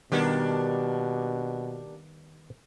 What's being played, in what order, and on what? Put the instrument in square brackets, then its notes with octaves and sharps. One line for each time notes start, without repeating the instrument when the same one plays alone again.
[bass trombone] B2 [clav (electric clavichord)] D#3 G3 B3 [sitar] A#3 D4 G4